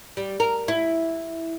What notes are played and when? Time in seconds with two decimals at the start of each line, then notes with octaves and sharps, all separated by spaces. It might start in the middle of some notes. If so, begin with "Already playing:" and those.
0.17 G3
0.40 A#4
0.68 E4